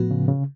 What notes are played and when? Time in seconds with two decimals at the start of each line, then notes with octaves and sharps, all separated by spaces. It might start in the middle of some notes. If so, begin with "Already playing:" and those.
Already playing: A2 F3 B3 F#4
0.11 C#3
0.28 C#3